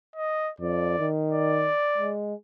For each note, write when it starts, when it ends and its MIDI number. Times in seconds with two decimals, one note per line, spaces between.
0.16 0.51 75
0.60 0.97 41
0.60 1.08 74
0.99 1.70 51
1.31 2.12 74
1.98 2.34 56